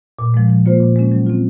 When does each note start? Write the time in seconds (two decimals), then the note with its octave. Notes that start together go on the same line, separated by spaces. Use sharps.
0.19 A#2
0.34 F3 G#3
0.50 F3
0.66 A#3 F4 C5
0.80 A#2
0.96 G#3 C#4
1.12 F#3
1.27 C4 F4